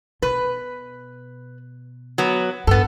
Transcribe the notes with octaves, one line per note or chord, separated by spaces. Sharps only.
B2 B4
F#3 B3
A1 G2 B3 A4